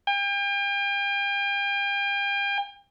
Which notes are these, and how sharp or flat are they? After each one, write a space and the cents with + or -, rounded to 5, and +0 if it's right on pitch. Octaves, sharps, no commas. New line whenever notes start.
G5 +40